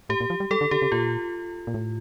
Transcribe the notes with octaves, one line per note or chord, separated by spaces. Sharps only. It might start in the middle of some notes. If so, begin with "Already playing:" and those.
A2 G4
A#2
F3
G3
G3 A4
D3
D3 G4
C#3
A#2 F4
A#2
A2